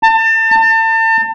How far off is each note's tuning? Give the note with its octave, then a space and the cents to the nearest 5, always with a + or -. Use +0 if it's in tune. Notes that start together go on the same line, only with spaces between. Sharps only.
A5 +30
A5 +35